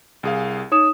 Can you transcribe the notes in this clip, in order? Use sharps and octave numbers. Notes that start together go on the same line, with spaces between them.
C2 G#4 F5
D#4 C#5 D#6 E7